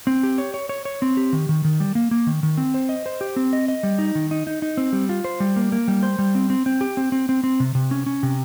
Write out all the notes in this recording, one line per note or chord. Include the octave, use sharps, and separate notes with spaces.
C4
G4
C#5
C#5
C#5
C#5
C4
G4
D#3
D#3
D#3
G3
A#3
A#3
D#3
D#3
C4
C5
D#5
C5
G4
C4
D#5
D#5
G3
D#4
D#3
D#4
D#4
D#4
C4
G3
F4
C5
G3
A#3
A#3
G3
C5
G3
C4
C4
C4
G4
C4
C4
C4
C4
C3
C3
C#4
C#4
C3